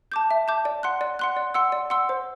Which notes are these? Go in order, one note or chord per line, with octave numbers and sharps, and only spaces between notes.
A5 D6 G6
E5
A5 D6 G6
D5
F#5 C6 F#6
D5
F#5 C6 F#6
D5
F#5 C6 E6
D5
F#5 C6 E6
C5